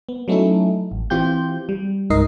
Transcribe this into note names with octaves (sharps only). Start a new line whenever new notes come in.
B3
F#3 A3 C#4 D#4 E4 A4
A1
E3 C4 F4 G4 G6
G3
C#2 G#2 D#4 A#4 D#5 C7